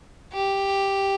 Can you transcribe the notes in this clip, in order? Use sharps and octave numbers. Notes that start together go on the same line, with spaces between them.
G4